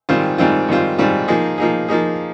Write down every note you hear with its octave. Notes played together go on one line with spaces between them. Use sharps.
G#2 D#3 G3 C4 F4
G#2 D#3 G3 C4 F4
G#2 D#3 G3 C4 F4
G#2 D#3 G3 C4 F4
F3 A#3 D#4 G#4
F3 A#3 D#4 G#4
F3 A#3 D#4 G#4